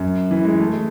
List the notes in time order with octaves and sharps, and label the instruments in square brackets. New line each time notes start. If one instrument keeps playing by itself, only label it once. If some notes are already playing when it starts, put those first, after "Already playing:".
Already playing: [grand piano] F#2
E3
G#3
A3
G#3